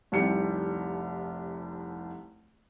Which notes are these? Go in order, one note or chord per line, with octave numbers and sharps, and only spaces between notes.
F1 C2 D#4 G4 C#7